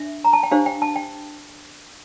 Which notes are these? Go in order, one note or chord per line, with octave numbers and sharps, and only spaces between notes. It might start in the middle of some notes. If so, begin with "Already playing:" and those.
Already playing: D4 E5
A#5
A5
G5
D4 G4 C5 F5
G5
A5
G5